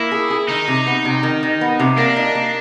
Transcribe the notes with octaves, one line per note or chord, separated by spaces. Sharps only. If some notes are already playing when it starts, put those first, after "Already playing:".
Already playing: A#3 E4
G#4
G#4
D#3 D#4
C3
B3
C3
D#3
D#3
B3
C3
A#3 D4
D#4
A#3